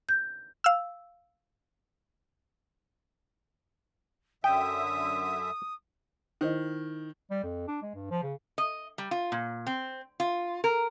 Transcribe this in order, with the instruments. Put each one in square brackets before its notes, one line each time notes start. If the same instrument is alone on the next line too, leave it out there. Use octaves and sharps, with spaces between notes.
[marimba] G6
[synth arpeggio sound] F5 E6
[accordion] F#2 D3 E5 [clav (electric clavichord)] G5 [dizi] D#6
[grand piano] D#3 [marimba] E4 C5 D#5
[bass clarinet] G3
F2
D4
G#3
G2
F3
C#3
[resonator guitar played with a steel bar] D#5
G3
F4
A#2
C4
F4
A#4